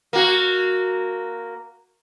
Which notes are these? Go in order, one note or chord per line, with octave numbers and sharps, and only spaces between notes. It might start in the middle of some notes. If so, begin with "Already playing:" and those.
A#3 F#4